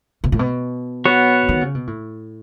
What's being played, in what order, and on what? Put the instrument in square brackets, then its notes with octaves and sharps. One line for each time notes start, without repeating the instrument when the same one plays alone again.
[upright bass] B2
A2
B2
[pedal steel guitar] B3 F#4 C#5
[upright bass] D#3
C#3
B2
A2